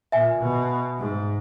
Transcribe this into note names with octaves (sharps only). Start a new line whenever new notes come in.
A#2 E5 G#5
B2
G#2